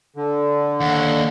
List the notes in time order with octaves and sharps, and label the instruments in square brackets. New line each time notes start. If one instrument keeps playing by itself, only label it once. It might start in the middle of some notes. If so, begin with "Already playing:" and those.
[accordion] D3
[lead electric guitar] D#2 [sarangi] F#5